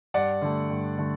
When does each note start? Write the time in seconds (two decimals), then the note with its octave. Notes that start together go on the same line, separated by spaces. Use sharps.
0.14 G2 D5 F#5
0.42 D3 A3
0.70 G2
0.98 D3 A3